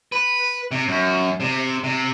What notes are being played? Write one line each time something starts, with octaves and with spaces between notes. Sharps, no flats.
B4
C3
F#2
C3
C3